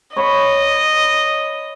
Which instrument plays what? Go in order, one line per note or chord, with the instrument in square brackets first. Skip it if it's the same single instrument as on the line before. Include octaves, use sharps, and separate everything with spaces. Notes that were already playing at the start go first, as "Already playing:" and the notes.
[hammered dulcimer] C#5 B5 [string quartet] D#5